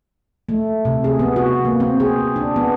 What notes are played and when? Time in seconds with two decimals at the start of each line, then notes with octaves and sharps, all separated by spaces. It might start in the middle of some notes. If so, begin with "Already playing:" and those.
0.49 A3
0.85 C3
1.04 G#4
1.19 B3
1.36 F#4
1.65 A#3
1.80 C4
2.00 G#4
2.36 D4
2.56 B3